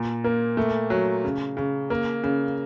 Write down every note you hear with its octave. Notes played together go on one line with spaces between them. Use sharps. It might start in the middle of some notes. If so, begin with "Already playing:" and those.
Already playing: A#2
A#3
A3
F#3
C#3
C#3
A#3
C#3